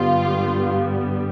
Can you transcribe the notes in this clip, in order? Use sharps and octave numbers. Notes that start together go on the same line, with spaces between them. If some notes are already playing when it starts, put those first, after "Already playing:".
Already playing: G2 D3 G3 B3 F4